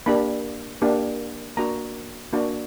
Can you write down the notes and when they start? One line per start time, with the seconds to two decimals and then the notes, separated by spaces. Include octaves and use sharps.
0.06 A#3 D4 G4 B5
0.82 A#3 D4 G4
1.57 A#3 D4 F#4 A#5
2.33 A#3 D4 F#4